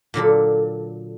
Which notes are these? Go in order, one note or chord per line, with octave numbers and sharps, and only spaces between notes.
A#2 D3 F#3 A4